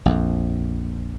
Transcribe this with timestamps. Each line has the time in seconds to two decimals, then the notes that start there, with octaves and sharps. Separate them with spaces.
0.06 A#1 F2